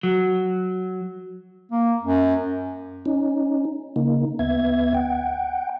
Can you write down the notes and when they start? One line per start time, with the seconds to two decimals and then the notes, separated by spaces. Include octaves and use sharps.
0.03 F#3
1.72 A#3
2.02 F#2
3.06 C#4 D#4
3.96 C#3 A#3 D#4
4.39 D2 B3 E5 G#6
4.94 F#5 G5